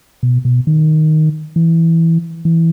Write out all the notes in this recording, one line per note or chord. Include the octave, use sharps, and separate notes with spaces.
B2
B2
D#3
E3
E3